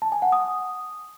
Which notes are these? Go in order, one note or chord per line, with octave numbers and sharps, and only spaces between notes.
A5
G#5
F#5
D#6